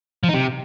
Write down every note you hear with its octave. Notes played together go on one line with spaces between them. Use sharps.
F3
D#4
C3